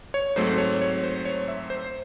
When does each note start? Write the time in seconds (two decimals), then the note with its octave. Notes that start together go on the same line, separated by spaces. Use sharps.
0.14 C#5
0.36 G#2 F#3 A3 C4 C5
0.58 C#5
0.81 C#5
1.04 C5
1.25 C#5
1.48 E5
1.70 C5